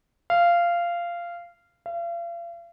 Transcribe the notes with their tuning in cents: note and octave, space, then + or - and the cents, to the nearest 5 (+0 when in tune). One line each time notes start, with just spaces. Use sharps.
F5 -15
F5 -40